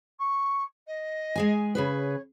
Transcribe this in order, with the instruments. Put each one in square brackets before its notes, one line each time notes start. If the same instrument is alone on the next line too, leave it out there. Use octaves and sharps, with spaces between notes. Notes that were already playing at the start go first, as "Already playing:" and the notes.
[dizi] C#6
D#5
[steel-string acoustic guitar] G#3 G#4 G#5
[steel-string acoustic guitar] C#3 G#4 B4 [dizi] C#5